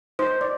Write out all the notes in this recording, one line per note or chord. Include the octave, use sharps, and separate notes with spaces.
D#4 C5
D5